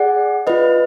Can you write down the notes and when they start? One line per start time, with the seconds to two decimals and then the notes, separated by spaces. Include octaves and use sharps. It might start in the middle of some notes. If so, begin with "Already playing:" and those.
Already playing: G#4 D5 F#5
0.47 F4 B4 D#5